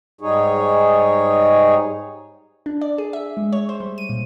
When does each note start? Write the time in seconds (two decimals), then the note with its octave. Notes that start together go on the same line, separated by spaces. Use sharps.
0.21 G#2 G3 D#4 G#4 C#5
2.66 D4
2.81 D5
2.98 G#4
3.13 E5
3.37 G#3
3.53 C#5
3.69 C5
3.80 G3
3.98 D#7
4.09 A#2